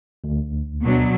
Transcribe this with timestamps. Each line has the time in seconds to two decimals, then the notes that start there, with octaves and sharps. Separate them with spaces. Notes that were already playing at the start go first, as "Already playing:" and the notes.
0.24 D2
0.82 B2 F#3 D4